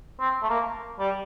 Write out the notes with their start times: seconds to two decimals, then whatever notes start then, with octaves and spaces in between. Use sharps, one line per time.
0.20 C4
0.42 A3
0.50 A#3
1.00 G3